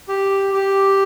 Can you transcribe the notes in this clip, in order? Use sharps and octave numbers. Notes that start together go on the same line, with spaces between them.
G4
G4